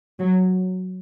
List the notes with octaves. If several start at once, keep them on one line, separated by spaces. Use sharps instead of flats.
F#3